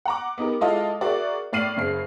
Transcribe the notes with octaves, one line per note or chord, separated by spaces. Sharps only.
F#5 A#5 D6
B3 D#4 G4 A#4
G#3 E4 F4 A4 D#5 F5
F#4 G#4 A#4 D5 E5
A2 D5 F6 C7 D#7 F#7
F#1 C#3 C7